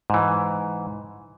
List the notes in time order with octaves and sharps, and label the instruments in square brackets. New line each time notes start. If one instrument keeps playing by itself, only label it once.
[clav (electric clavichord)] G#2 E3